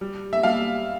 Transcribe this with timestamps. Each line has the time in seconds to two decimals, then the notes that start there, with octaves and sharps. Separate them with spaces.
0.01 G3
0.33 E5
0.43 G3 F5